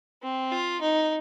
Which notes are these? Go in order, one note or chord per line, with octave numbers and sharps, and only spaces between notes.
C4
F4
D#4